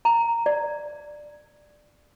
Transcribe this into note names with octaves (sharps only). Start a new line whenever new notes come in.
A#5
D5